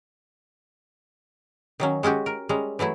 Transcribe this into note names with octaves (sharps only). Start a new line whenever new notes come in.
D#3 F#3 C#4
G#3 C#4 F#4 G4
A#4
G3 G#3 C#4 A#5
E3 F#3 A3 E4